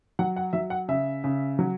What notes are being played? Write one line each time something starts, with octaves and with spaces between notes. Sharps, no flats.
F#3 F#5
F#5
F#3 E5
F#5
C#3 E5
C#3
F#3